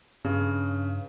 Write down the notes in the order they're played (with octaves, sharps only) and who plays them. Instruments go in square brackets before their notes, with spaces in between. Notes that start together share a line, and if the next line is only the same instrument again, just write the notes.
[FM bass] G2 [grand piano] C#3